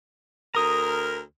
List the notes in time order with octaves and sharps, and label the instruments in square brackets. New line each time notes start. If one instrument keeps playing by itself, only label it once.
[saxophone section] D2 A#4 [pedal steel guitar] A#5 D#6